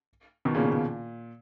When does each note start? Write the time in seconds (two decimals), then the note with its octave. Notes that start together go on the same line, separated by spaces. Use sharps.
0.45 B2 D#3
0.55 A#2 C#3
0.64 B2
0.72 A#2